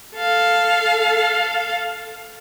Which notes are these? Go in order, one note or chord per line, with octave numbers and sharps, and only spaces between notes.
A4 F5